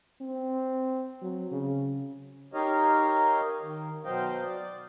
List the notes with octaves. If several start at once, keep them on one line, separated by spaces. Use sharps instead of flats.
C4
F#3
C#3
D#4 G4 A#4 C#5 D#5 F5
D#3
B2 F#3 C5 D#5 F5 G5
D5